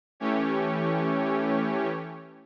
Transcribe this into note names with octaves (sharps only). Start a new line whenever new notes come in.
E3 A3 C#4 G4 C#5